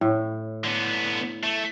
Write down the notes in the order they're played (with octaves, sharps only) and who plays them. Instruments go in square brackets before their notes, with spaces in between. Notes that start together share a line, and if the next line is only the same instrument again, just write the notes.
[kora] A2
[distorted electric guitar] D3 B3
A3